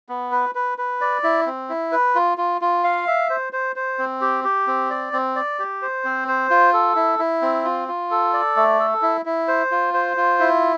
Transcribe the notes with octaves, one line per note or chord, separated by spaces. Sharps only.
B3
B4
B4
B4
D5
E4
C4
E4
B4
F4
F4
F4
F5
E5
C5
C5
C5
C4
G4
G4
C4
D5
C4
D5
G4
C5
C4
C5
F4
A4
E4
E4
C4
F4
F4
A4
D5
A3
A4
E4
E4
C5
F4
C5
F4
E4